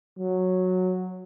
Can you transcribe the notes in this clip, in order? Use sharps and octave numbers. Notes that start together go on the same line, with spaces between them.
F#3